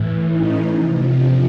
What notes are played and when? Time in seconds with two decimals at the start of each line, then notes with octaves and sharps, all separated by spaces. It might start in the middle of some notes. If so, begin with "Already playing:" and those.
Already playing: A2 E3
0.28 C#4 D#4
0.72 C3 F3
1.16 C4 D4